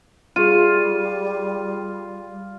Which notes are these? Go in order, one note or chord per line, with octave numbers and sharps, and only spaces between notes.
G3 F4 G#4 D#7